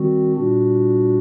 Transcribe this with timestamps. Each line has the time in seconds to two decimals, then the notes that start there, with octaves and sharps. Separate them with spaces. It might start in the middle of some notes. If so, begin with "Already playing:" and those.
Already playing: D#3 G3 C4 F#4
0.35 A#2 G3 D4 F#4